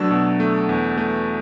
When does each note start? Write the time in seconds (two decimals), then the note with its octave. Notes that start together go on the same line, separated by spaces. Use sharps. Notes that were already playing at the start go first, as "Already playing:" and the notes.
Already playing: B2 F#3 A3 D4 E6
0.11 B2
0.40 A3
0.69 E2
0.98 A3